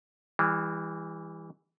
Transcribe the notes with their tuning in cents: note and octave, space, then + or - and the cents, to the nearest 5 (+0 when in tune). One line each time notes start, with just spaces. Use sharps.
E3 +0 G3 +40